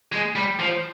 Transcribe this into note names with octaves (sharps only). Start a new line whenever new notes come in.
G#3
G3
F3